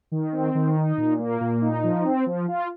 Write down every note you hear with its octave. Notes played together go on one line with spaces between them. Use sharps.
D#3
C4
D#3
D#4
A#2
A#3
A#2
D#4
F3
C4
F3
F4